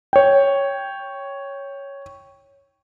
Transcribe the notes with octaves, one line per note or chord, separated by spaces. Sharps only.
C#5 G5